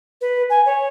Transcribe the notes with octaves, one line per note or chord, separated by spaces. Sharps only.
B4
G#5
C#5